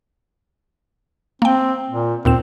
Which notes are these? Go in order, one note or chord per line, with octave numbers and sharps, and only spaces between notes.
A#3 C4 G5
A#2
D#2 A#2 C4 E7